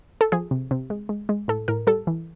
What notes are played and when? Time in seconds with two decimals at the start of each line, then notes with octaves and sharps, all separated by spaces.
0.21 A4
0.32 F3 G#4
0.51 C3
0.71 C3
0.90 G#3
1.09 G#3
1.29 G#3
1.48 A2 A4
1.68 A2 A#4
1.87 G3 A4
2.07 E3